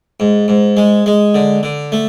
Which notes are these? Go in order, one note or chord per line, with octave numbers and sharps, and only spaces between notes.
G#2
G#2
G#3
G#3
D3
D3
A3